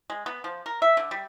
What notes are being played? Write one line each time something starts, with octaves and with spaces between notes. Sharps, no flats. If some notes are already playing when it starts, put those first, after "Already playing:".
G#3
B3
F3
A#4
E5
D3
G3